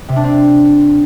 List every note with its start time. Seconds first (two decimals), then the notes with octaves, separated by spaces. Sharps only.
0.09 C3
0.16 D4
0.24 C4